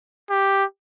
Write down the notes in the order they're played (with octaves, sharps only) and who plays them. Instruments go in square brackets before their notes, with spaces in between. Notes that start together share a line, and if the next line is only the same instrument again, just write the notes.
[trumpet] G4